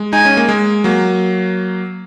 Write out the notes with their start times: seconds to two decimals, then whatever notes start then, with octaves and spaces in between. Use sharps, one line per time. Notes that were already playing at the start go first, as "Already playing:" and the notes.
Already playing: G#3
0.13 D#4 G#5
0.25 C#4
0.37 A#3
0.49 G#3
0.84 F#3 A#3